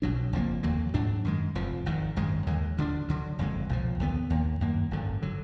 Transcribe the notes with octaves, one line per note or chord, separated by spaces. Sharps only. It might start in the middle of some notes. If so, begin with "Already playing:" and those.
B1 B2 F#3 D4
F#1 F2 F3 A#3
D#2 D3 F#3 A#3
G#2 F#3 D4
F#2 D#3 G#3
F1 F2 F3
G#1 G#2 D#3
G#1 F#2 D#3 G#3
D#2 D3 G#3
D2 D3 G#3 D4
D2 D3 F#3
F#1 F2 D3 G#3
B1 A#2 F3
D#2 D3 F3 B3
D#2 D#3 A#3
F#2 D#3 A#3
G#1 F#2 D3
D3 F#3